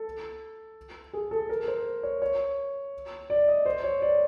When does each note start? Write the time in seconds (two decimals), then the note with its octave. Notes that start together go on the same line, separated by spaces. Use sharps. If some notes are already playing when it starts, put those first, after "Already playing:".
Already playing: A4
1.13 G#4
1.31 A4
1.49 A#4
1.68 C5
2.03 C#5
2.22 C#5
3.30 D5
3.48 D#5
3.66 C5
3.84 C#5
4.02 D5